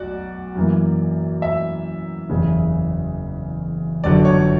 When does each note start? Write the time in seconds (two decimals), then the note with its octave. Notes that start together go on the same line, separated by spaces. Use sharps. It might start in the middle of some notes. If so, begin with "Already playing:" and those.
Already playing: B1 F#4 D5
0.55 F#2 E3 A#3
1.42 E5
2.29 F#1 E2 C#3 G3
4.04 G1 F#2 D3 F#3 D5
4.25 C#5